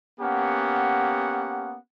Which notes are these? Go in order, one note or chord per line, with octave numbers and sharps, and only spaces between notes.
A#3 B3 C#4 G4 F#5